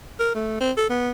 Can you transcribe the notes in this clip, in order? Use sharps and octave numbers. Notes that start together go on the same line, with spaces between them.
A#4
A3
C4
A4
B3